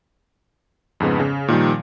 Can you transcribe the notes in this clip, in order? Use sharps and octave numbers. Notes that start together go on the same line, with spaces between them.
F2 G#2 C#3 B3
C#3
A#2 D#3 F3 G3